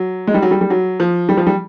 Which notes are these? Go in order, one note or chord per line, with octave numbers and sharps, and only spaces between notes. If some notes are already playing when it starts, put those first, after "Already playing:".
Already playing: F#3
G#3
G3
F#3
G3
G3
F#3
F3
G3
F3
G3